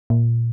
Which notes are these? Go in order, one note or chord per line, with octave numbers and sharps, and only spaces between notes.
A#2